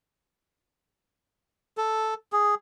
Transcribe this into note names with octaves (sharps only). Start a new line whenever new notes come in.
A4
G#4